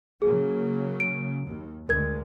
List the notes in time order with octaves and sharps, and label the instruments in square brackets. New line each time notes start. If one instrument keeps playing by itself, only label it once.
[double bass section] C#3 F#3 A#3 [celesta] G#4
[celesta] D7
[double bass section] D#2
[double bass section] D2 G#3 [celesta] A#4 G#6